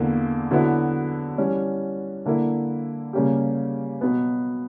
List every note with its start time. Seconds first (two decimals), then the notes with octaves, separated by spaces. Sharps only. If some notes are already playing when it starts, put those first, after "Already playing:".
Already playing: E2 D3 A#3 E4
0.51 D3 F#3 B3 E4
1.38 E3 G3 C#4
2.26 D3 A#3 E4 A#4
3.13 C#3 G3 A#3 C#4 G4
4.01 B2 F#3 B3